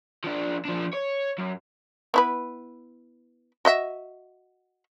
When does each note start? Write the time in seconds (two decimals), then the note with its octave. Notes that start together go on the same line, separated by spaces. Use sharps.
0.24 F3 D4
0.65 F3 D4
0.93 C#5
1.38 F#2
2.14 B3 E4 B4
3.65 F#4 D#5 E5